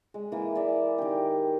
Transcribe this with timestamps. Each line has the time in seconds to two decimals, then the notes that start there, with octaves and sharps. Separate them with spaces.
0.14 G#3
0.32 E3 A#3
0.55 D5 E5
0.98 D#3 G4